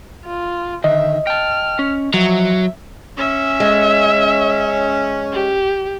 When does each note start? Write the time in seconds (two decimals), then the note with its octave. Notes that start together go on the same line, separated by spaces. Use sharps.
0.25 F4
0.84 D3 D#3 D#5 E5
1.27 G5 A5 F6
1.79 C#4
2.14 F3 F#3 E5
3.18 C#4 E5
3.60 G#3
5.33 G4